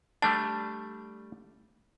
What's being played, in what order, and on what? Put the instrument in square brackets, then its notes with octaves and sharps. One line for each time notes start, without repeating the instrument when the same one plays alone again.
[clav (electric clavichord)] G3 A3 D4 [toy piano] A5